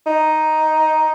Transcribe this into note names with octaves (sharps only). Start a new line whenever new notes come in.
D#4